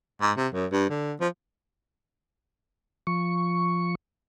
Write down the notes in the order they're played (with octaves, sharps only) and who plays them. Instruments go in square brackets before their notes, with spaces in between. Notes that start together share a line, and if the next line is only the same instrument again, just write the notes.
[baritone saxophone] G#2
C3
F#2
G2
D3
F3
[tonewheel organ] F3 C#6